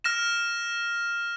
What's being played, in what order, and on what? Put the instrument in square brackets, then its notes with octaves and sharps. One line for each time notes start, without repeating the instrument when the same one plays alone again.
[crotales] F6 A#6 E7